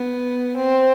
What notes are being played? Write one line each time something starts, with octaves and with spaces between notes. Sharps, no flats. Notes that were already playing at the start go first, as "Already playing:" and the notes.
Already playing: B3
C4